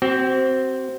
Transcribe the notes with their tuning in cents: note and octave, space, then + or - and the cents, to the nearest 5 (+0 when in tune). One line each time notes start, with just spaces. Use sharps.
C4 +0 F#4 +40